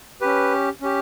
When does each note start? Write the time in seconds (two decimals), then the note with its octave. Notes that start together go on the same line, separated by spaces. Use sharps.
0.21 C#4 G4 B4
0.81 C#4 G4